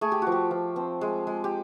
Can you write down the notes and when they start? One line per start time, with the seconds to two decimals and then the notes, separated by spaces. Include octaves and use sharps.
0.01 A3 G#4
0.12 G4
0.22 F3 F#4
0.32 G4
0.51 F3
0.76 C4
1.01 G#3
1.27 G#3
1.44 G4